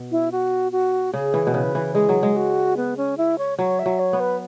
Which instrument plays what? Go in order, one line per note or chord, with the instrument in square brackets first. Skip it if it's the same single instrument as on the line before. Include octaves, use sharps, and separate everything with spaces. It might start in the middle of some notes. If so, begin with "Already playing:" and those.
Already playing: [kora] B2
[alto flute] E4
F#4
F#4
[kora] C#3 [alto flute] G#4
[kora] E3
B2
[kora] C#3 [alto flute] B4
[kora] E3
[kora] G#3 [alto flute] G#4
[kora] F#3
G#3
[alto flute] F#4
B3
C#4
E4
C#5
[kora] F#3 [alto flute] C#5
[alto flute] E5
[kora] F#3
[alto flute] C#5
[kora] B3
[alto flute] B4